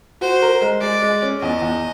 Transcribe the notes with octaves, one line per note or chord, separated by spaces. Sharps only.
F#4 C5
A#4
G#3
G#3 D5
G#3
C#4
E2 D#5
E2